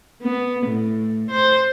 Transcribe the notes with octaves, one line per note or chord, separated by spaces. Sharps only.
B3
A2
C5